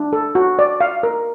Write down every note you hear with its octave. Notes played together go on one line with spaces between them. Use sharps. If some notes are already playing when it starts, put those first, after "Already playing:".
Already playing: D4
A4
F#4
D5
F5
A#4